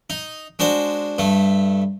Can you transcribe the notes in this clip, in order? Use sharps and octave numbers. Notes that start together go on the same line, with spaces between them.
D#4
G#3 D4 F#4 C5
G2 A3